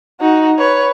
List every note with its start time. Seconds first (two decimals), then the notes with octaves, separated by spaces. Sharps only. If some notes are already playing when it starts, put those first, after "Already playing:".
0.21 D#4 F#4
0.58 B4 C#5